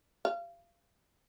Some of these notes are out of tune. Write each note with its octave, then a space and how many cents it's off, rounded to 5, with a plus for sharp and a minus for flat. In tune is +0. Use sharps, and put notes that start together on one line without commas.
F5 -30